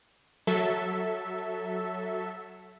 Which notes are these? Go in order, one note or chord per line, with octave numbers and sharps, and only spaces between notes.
F#3 A4 E5